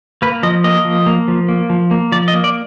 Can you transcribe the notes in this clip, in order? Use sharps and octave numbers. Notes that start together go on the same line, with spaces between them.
A#3 B4
F3 D#5
A#3 D#5
F3
A#3
F3
A#3
F3
A#3
F3 D5
D#5
A#3
D5